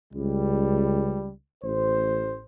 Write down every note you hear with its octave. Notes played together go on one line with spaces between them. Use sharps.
C#2 G3
A1 C5